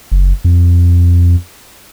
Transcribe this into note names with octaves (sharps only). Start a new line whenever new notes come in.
F#1
F2